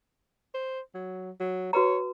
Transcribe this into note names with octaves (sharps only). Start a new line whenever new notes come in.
C5
F#3
F#3
F#4 B4 C#5 A#5